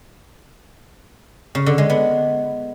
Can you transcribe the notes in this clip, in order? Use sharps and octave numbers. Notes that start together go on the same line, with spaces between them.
C#3
D3
G#3
B3